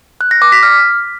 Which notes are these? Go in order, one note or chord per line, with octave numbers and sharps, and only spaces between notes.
F#6
A#6
D6
B6
F6